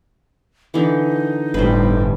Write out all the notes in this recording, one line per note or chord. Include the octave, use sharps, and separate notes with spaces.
D3 E3 D#4
G1 A2 G3 B4 C5